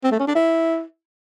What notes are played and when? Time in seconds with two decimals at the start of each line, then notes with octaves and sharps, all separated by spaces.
0.03 C4
0.11 A3
0.19 C#4
0.27 D4
0.35 E4